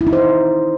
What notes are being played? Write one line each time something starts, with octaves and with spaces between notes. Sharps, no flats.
E4
D#4
C5